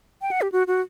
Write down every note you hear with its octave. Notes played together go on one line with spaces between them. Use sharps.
G5
F#5
G4
F#4
F#4